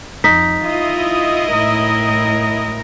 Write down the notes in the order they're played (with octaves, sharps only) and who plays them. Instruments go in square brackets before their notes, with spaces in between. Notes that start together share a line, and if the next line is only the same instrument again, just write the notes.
[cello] F2 [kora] D#4 [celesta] B6
[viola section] E4 D#5 [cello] F4
[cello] A2 A#4